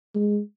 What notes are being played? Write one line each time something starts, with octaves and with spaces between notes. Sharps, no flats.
G#3